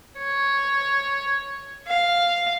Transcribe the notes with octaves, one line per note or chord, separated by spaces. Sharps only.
C#5
F5